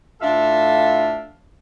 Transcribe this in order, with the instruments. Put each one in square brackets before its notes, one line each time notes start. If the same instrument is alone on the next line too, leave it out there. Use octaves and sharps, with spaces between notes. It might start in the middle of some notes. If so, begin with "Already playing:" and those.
[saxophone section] A2 D4 F4 A4 E5 F5